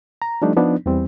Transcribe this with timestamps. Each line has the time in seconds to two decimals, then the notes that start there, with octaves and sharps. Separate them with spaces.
0.22 A#5
0.42 F3 G3 A3 D4 D#4
0.57 F3 B3 D4 D#4
0.86 E2 E3 G3 C4